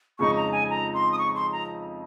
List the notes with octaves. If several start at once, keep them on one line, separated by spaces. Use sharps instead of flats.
F2 C#3 G#3 D#4 C#6
A#5
G#5
A#5
C6
D#6
C#6
C6
A#5